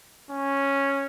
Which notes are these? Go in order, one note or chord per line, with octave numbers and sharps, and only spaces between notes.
C#4